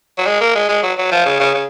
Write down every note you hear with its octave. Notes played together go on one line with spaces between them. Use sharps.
F#3
G#3
A#3
G#3
G#3
F#3
F#3
F3
C#3
C#3
C#3